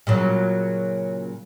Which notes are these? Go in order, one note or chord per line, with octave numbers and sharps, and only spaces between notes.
A#2 C#3 F#3